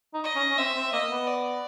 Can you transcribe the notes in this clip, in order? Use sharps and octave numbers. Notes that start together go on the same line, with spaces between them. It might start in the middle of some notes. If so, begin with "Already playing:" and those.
D#4
D#5
C#4
C#4
C4 E5
C4
A#3 D#5
B3
D5